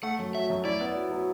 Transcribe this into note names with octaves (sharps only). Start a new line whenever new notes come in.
A3 F#5
F#2
F#3 E5
F#2
E4 D5
B3
F#3
F#3